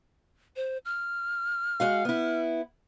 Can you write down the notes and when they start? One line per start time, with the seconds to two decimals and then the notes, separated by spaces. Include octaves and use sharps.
0.56 C5
0.85 F6
1.80 G#3 F#4 F5
2.05 B3 E4